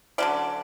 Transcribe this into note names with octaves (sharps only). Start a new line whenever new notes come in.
D3 F#3 C#4 D5